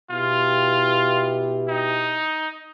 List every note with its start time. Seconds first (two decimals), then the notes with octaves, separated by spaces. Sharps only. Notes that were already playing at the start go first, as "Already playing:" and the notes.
0.11 B2 E4 F4 G4
1.69 D#4